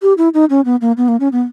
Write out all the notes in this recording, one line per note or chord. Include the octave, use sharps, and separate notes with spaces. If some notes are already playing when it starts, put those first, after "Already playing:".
G4
E4
D#4
C#4
B3
A#3
B3
A#3
C#4
B3